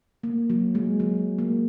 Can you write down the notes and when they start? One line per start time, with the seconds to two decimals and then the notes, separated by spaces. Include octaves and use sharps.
0.23 A#3
0.50 F#3
0.75 G#3
1.00 F#3
1.38 A#3